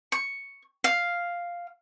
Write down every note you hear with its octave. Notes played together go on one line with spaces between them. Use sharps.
C#6
F5